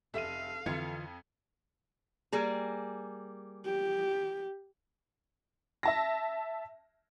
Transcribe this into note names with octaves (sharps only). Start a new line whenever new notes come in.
F1 A4 E5 F5 D#7
F2 D3 E3 F4 G#6 C#7
G3 A#3 G#4
G4
E5 A5 A#6